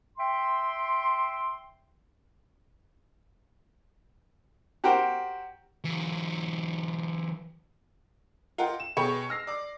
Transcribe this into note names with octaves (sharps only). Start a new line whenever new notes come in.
E5 G5 C6
F#4 G4 A#4 C5 G5
E3 F#3
F4 A#4 D#5 F#5 G5
E7
B2 G#4 C#5 G5 B5 C#7
E6 F6 A#6 C7
D5 D6